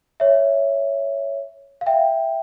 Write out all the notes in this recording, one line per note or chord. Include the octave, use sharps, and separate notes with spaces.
C#5 E5
F5
E5 G5